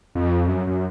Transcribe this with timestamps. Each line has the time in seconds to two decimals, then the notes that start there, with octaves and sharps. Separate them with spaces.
0.15 F2
0.48 F#2
0.67 F#2